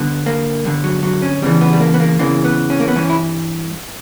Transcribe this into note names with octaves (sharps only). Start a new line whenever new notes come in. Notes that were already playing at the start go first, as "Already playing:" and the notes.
Already playing: G2 D3 B3
A#3
G2 D3
F#3
F#3
C#4
E2 C#3 E3 G3
B3
G3
A#3
B3
A#3
E2 C#3 E3 A#3
B3
C#4
A#3
B3
G2 E3 C#4
E4